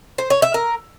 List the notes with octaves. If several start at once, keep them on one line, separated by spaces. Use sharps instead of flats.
C5
C#5
E5
A#4